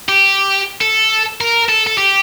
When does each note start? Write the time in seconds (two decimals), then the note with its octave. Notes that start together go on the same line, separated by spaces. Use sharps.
0.09 G4
0.81 A4
1.41 A#4
1.69 A4
1.87 A4
1.98 G4